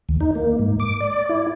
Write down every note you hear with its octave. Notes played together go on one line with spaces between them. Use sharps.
D#2
D#4
A#3
G#2
D6
D5
E4